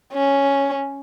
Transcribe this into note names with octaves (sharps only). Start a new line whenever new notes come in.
C#4